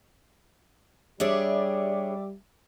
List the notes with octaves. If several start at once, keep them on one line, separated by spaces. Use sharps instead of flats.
G3 D4 G#4 C#5 D5 E5 D6